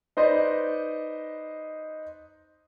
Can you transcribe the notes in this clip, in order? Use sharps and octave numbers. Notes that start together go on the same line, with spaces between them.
D#4 B4 C5 D5 D#5